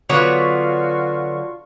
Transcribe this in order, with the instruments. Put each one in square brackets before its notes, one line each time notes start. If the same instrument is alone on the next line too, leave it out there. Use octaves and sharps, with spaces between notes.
[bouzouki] D3 [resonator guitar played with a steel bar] F#3 B3 C#5 [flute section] F4 F#4 C#6